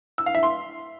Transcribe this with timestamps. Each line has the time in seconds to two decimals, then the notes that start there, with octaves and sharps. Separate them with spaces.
0.18 E6
0.26 F5
0.35 E5
0.43 C6